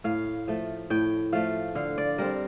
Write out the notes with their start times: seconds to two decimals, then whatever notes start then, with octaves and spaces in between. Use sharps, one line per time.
0.04 A2 F5
0.48 F3 A3
0.90 A2 G5
1.32 F3 A3 F5
1.75 D3 F5
1.98 D5
2.18 G3 C4 A#4